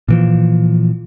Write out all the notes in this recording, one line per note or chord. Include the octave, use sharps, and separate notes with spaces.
A#2 E3 F3